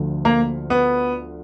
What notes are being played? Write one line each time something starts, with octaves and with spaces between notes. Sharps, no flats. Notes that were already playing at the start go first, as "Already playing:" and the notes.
Already playing: D2 D3 F3
A#3
B3